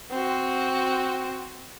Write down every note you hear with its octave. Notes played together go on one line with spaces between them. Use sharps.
C4 F#4